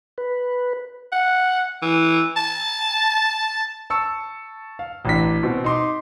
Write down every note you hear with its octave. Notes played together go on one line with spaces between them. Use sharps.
B4
F#5
E3
A5
A5 C#6 E6 C#7
F5
A1 D4 B6
B2 C4
D#4 C6 D6